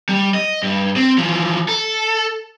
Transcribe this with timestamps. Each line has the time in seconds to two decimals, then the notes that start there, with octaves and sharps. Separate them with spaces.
0.09 G3
0.34 D#5
0.63 G2
0.96 C4
1.18 E3 F3
1.68 A4